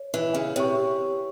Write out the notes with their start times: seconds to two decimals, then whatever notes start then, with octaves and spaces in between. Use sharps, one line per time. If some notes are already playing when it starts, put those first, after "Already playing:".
Already playing: C#5
0.14 E3
0.34 C#3
0.55 C3 C#5 G5 C#6